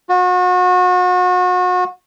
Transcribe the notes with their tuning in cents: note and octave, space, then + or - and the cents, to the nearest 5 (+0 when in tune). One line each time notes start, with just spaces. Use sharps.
F#4 -35